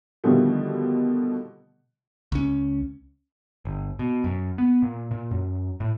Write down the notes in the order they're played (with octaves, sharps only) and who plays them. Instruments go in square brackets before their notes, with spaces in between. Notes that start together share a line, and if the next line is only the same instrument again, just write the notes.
[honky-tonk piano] B2 D3 D#3 F3 G3 A3
[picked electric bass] C#2 C#4
G1
B2
F#2
B3
A#2
A#2
F#2
A2